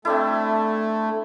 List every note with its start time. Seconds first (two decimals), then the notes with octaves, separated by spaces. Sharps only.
0.05 A3 C4 D4 E4